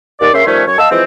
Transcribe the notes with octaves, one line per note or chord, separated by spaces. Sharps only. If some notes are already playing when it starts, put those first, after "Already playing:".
D#2 D5
C#3 A#3 C#4 E5 C6
D#3 F3 G3 A3 C#4
F#2 C#5
D#5 F5 A5 E6
E3 F3 G#3 C4